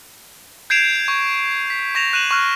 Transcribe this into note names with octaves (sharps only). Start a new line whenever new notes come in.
G6 G#6 C7 D7 E7 F7
C#6
B6
C#6 A#6 E7 F7
F#6 D#7 E7 F#7
C#6 F6 F#6